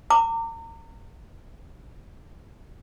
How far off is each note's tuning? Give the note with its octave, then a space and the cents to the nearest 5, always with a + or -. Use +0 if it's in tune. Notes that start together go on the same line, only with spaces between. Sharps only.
A#5 -35 D6 +0